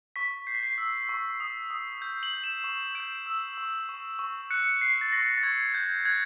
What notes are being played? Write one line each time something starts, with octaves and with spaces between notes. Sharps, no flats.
C#6 B6
G6 C7
B6
C7
E6
C#6
D#6
D#6
G6
F#7
G6
E7
C#6
G6 D7
E6
C#6
C#6
C#6
F#6 C#7
F#6 C7
A6
C#6 A#6
A6
C#6 G#6
F#6 G6
F#6 G#6